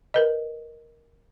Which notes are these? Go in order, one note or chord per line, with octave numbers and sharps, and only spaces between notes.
A#4 B4 D#5